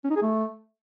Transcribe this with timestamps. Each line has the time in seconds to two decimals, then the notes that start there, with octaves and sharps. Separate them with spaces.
0.04 C#4
0.10 D#4
0.16 G#4
0.22 A3